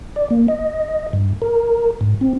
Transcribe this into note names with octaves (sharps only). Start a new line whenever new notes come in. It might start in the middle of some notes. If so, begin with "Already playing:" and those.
D5
A#3
D#5
G2
A#4
G#2
C4